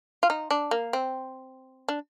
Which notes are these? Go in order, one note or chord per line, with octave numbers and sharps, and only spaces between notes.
F4
D#4
D4
A#3
C4
D4